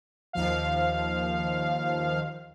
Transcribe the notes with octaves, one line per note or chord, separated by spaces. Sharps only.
D#2 F3 F5